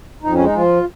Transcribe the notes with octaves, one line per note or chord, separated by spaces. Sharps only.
F2 D#4
C#4
G#3
D#4
F3 F4